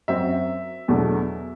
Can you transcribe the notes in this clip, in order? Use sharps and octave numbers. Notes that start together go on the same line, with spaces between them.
F#2 F#3 C4 E5
E2 B2 F#3 A3 D4